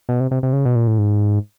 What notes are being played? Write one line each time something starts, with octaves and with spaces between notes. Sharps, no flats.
B2
C3
C3
C3
C#3
B2
A#2
A2
G#2